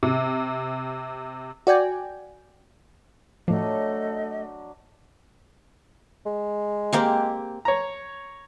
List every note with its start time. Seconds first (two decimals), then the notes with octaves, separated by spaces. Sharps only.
0.03 C3
1.67 F#4 D5 G5 G#5
3.48 A2 F3 F#3 A3 D4 D#5
6.26 G#3
6.93 A#3 C4 G4
7.65 C#5 A#5